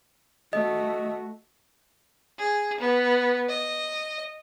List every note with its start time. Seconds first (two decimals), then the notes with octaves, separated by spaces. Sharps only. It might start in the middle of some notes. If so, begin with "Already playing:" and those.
0.53 A3 F#4 D#5
2.38 G#4
2.80 B3
3.49 D#5